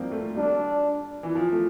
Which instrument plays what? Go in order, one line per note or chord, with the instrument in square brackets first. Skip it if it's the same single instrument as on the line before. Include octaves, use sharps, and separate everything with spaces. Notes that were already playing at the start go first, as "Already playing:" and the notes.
Already playing: [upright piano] F3 G3 A#3 C4
A3
[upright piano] G3 [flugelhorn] D4
[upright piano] E3
F3
A3